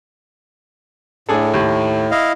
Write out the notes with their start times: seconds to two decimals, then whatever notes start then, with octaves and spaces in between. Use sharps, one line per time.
1.29 A2 D4 G#4 A4
1.54 D#2
2.11 E4 D#5 F5